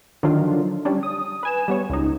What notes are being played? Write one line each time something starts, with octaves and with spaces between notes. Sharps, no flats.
D3 D#3 F3 F#3 D4 F4
G3 C#4 D4
D#6
B4 G#5 E7
G3 B3 C#5
C#2 D#4